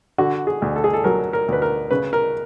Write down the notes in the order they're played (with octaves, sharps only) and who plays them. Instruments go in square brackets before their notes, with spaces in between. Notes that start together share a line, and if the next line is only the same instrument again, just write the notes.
[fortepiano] D3 F#4
G#4
D2
A4
G#4
A4
F#3 A#4
A#4
D2 B4
A#4
C#3 B4
A#4